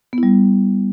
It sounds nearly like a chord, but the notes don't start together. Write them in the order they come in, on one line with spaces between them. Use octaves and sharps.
B3 E4 G3